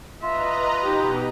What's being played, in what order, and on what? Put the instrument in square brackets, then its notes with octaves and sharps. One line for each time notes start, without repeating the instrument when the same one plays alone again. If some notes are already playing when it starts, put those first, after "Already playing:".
[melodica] F4 [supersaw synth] B4 D#5 A#5 [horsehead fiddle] E5
[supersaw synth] B2 [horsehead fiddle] D#4 G4